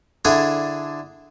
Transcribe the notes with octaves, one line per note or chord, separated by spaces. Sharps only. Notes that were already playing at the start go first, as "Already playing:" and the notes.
D3 D4 E4 G#4 A4